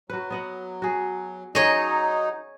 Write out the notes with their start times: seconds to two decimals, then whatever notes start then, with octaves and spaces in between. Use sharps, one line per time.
0.10 F#3 F#4 B4
0.30 B3 D#5 F#5
0.82 F#4 G#4
1.55 F#3 D#4 G#4 C#5 D#5